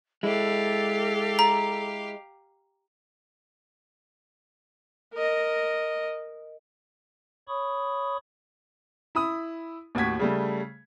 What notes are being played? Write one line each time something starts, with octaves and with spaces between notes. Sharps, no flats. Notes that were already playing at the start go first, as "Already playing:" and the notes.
G#3 E4 G4 A4 F5
A#5
A#4 D#5
C#5 B5 C#6 D#6
E4 B5 D#6
D#2 A2 F#4 G#6 B6
C#3 G3 A3